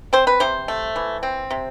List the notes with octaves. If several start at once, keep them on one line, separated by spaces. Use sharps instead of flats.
C4 C5
B4
C3 C5
A3
E3
C4
C3